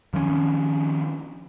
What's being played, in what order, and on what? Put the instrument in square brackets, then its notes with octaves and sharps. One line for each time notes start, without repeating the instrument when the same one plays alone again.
[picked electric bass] D#3 F3 A3 C#4